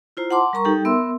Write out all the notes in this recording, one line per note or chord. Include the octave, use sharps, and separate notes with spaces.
E4 F4 C5 A#5
F#5 A5 C6 D6
G3 A#4 A#5 C#6
G3 D#4 G4 A4 G5
B3 A#4 E5 C6 E6